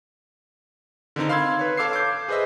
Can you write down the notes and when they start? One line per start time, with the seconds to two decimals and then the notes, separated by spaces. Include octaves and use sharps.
1.16 D3 D#3 C4 D#4
1.29 F5 B5 C6 E6 G#6
1.59 B4 C#5
1.77 A4 F5 D6 E6 G#6 C7
1.93 D6 G6
2.28 G#4 B4 C5 D#5 E5